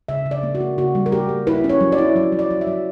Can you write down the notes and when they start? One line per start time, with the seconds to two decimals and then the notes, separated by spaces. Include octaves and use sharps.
0.08 C#3 E5
0.26 C#3
0.31 D5
0.43 A#3
0.55 F#4
0.60 A#3
0.78 C#3 F#4
0.95 G3
1.06 A#4
1.12 A#3 G4
1.29 A#3
1.47 E4 B4
1.64 C#4
1.70 C#5
1.81 F#3
1.92 D5
1.98 E4
2.16 F#3
2.32 F#3
2.39 D5
2.51 F#3
2.61 E5
2.67 F#3